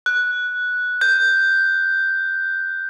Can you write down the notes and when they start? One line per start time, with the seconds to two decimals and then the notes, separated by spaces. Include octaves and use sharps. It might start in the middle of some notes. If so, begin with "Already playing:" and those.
0.06 F#6
1.01 G6